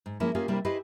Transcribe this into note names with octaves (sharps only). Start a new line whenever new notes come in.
G#2
F3 G#3 A#3 C#4 E4
A#3 C#4 F4 G4 G#4
C3 G3 A#3 C4 D4 E4
E4 G4 G#4 B4 C5 D#5